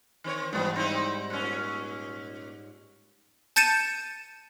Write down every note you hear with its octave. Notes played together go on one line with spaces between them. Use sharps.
D#3 C4 C#5
G#2 E3 G3 B3
C4 D#4 E4
A#2 C#4
A5 G6 A6 C#7 D#7 E7